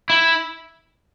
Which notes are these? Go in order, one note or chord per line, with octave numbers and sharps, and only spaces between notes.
E4